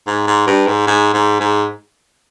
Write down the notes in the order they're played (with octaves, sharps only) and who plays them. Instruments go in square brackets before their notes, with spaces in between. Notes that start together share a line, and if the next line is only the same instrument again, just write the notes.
[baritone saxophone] G#2
G#2
G2
G#2
G#2
G#2
G#2